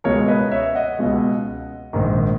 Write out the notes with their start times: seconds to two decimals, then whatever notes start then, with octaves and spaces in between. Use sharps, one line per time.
0.04 C#2 B2 G#3 A#4 C#5
0.28 B4 D#5
0.51 C#5 E5
0.75 D#5 F#5
0.99 C#2 B2 G#3
1.93 A#1 G#2 D#3